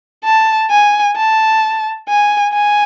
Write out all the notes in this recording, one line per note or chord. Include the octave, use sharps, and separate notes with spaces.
A5
G#5
A5
G#5
G#5